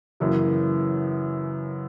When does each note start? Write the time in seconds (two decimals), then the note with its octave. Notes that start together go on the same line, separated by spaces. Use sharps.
0.20 F#2 C#3 E3 A#3